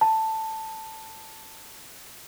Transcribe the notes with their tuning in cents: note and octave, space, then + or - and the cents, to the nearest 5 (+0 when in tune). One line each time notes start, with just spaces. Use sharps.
A5 +10